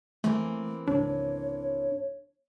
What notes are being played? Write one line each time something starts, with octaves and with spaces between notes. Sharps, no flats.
E3 A3 A#3 C4
C#2 G#2 D4 C#5